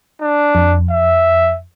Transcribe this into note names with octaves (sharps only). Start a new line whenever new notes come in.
D4
F2
E5